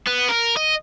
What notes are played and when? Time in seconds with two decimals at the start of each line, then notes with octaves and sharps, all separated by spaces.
0.07 B3
0.29 A#4
0.57 D#5